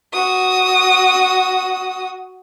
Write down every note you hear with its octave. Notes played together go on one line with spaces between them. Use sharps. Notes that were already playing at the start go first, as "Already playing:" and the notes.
F#4 D#6